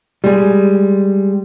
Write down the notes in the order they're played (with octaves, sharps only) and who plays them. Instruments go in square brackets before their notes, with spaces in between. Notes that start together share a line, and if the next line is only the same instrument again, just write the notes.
[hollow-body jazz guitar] G3 G#3